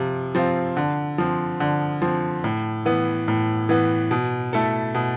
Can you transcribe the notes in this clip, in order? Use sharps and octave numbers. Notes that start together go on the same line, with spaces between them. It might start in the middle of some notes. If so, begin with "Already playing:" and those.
Already playing: C3 F3 F4
F3 C4 F4
D3
F3 C4
D3
F3 C4
A2
E3 B3
A2
E3 B3
B2
A3 E4 A4
B2